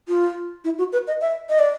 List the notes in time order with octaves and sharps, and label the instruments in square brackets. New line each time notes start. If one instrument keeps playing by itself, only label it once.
[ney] F4
E4
F#4
B4
D#5
E5
D#5
D5